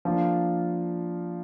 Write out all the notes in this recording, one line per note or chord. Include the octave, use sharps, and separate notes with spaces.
F3 A#3 D4 F4